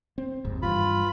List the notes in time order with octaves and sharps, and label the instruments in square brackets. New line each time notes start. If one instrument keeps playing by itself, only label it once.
[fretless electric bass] C4
F#1 D#2 G#2
[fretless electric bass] G2 E3 [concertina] F4 B5